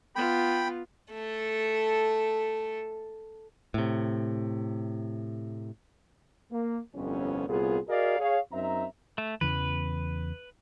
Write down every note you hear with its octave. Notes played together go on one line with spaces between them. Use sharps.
B3 F4 G5 B5
A3 A4
A2 C3
A#3
G1 C2 F2 B3 C#4
C2 A#2 B3 F4 G#4
F#4 G#4 A#4 D5 D#5 F5
G#4 C#5 F5
F#2 C4 D#4 E5 A#5
A3
E2 C#3 E3 B4